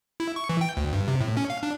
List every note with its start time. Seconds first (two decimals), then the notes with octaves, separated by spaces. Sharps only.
0.20 E4
0.36 C#6
0.49 E3
0.61 G5
0.77 D2
0.93 G2
1.08 C3
1.20 A2
1.37 C#4
1.50 F5
1.63 D4